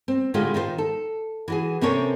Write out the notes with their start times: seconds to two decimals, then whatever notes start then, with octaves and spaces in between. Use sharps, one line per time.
0.08 C4
0.34 A2 D3 G#3 F4 G4 G#4
0.54 D#3 D#4 F4 G#4 C5
0.78 A4
1.48 E3 F#4 G#4
1.81 C3 C4 C#4 A4 A#4 C#5